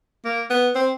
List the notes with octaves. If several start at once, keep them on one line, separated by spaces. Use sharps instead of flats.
A#3
B3
C4